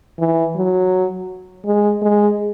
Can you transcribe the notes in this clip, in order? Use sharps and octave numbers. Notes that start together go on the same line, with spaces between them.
E3
F#3
G#3
G#3